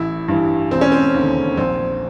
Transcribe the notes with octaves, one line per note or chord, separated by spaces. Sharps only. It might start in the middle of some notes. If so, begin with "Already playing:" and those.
Already playing: A1 E4
G2 E3
E1 C4
C#4
C4
D#2 D3
A#1 C4